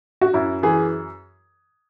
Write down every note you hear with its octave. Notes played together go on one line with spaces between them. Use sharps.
F#4
F#2 E4
E3 G#4